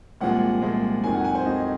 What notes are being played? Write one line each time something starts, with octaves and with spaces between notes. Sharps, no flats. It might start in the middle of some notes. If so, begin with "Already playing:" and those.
C2 A#2 F3 G#3 F#5
C2 A#2 F3 G#3
F2 D#3 F#3 G#5
F#5
G#5
C5
F2 D#3 F#3 D#5